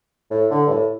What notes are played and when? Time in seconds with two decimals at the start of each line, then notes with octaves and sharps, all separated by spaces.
0.31 A2
0.51 D3
0.67 G2
0.70 A2